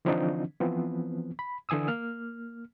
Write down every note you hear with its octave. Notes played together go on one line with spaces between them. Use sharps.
D3 E3 F3 C4 D4 D#4
E3 F3 B3 C4
B5
D3 E3 G#5 D#6 E6
A#3 F6